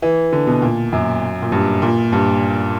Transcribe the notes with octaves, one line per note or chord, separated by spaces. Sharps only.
E3
D3
B2
A#2
F#2
A#2
G2
A#2
G2